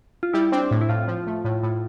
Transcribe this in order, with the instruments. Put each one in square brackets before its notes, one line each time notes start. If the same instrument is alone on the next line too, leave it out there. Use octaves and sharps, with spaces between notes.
[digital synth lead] F4
[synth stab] G3 [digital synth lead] E4
[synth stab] C4 [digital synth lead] D4
[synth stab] A2
[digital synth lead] E4
[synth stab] A2 [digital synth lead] F4
[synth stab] F3
A3
A2
A2